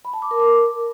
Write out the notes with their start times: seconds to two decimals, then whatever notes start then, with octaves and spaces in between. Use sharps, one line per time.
0.05 B5
0.13 A5
0.22 D6
0.31 A#4
0.40 D6